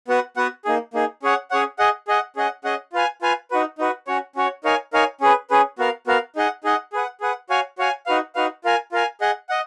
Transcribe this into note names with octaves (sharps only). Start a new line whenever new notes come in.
B3 F#4 B4 F#5
B3 F#4 B4 F#5
A#3 D#4 G#4
A#3 D#4 G#4
C#4 G#4 C#5 F#5
C#4 G#4 C#5 F#5
G#4 D#5 F#5
G#4 D#5 F#5
C#4 G#4 D#5 F#5
C#4 G#4 D#5 F#5
F4 B4 F5 G#5
F4 B4 F5 G#5
D#4 F#4 B4
D#4 F#4 B4
C#4 F#4 C#5
C#4 F#4 C#5
D#4 A#4 C#5 F5 G#5
D#4 A#4 C#5 F5 G#5
C#4 G#4 B4
C#4 G#4 B4
B3 F#4 A#4 F5
B3 F#4 A#4 F5
D#4 G#4 D#5 F#5
D#4 G#4 D#5 F#5
G#4 B4 F#5
G#4 B4 F#5
F#4 C#5 F5 G#5
F#4 C#5 F5 G#5
D#4 F#4 B4 F5
D#4 F#4 B4 F5
F4 A#4 F5 G#5
F4 A#4 F5 G#5
G#4 D#5 F#5
D#5 F#5